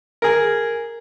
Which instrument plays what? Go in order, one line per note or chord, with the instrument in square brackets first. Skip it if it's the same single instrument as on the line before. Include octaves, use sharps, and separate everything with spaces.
[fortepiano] G#4 A#4